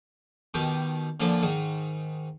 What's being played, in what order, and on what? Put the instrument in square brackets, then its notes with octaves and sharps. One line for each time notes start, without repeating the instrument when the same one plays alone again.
[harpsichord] B2 D#3 G4
A#2 D3 F3
G#2 D#3